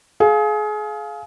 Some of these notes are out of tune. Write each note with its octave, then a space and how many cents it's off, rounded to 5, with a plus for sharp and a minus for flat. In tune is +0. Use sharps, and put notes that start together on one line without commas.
G#4 +30 F5 +0